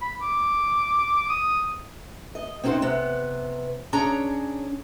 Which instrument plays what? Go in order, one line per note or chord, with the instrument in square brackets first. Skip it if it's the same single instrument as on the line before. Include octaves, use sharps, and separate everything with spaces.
[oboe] B5
D6
D#6
[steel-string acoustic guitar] D#5
C4 C#4 D#4 F4 F#4 C5
C3 B3
C#4 D4 G#4 C#5 A#5